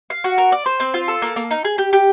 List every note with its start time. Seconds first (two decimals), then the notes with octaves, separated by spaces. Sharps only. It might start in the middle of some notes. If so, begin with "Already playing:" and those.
0.10 F5
0.24 F#4
0.38 A#4
0.52 D5
0.66 C5
0.80 C4
0.94 F4
1.08 A4
1.22 A#3
1.36 A#3
1.51 D#4
1.65 G#4
1.78 G4
1.93 G4